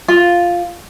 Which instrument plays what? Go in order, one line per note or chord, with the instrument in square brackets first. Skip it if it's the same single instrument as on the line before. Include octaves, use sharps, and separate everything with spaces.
[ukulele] F4